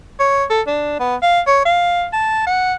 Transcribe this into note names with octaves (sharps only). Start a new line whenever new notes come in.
C#5
A4
D4
B3
F5
C#5
F5
A5
F#5